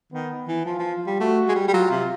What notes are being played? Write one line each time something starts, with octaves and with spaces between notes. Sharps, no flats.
D#3 B3
E3
F3 F4
F3
G3
A3 F#4
G#3
G3
G3
F#3 F4
C3